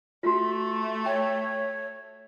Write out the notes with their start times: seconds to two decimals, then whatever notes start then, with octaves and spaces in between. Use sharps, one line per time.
0.23 A3 F4 F#4
1.06 C#5 G5